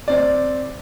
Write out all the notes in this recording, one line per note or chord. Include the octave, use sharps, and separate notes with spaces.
C4 D5